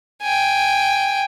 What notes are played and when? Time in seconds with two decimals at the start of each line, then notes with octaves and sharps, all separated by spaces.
0.23 G5 G#5